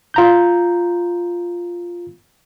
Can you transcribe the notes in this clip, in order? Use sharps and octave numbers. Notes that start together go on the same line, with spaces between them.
F4 A#5 G6